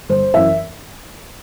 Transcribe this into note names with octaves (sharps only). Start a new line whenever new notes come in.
G1 C5
F#2 E3 E5